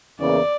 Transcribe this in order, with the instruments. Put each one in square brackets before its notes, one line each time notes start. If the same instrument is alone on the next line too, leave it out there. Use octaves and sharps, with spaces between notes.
[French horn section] E2 C#3 E3 A#3 [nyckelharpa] D5